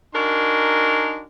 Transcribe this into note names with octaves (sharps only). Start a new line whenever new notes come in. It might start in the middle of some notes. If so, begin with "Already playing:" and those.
D4 D#4 F#4 A#4 G#5 C6